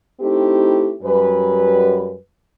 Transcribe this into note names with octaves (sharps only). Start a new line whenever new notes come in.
A3 C4 D#4 E4 G4
F#2 G3 B4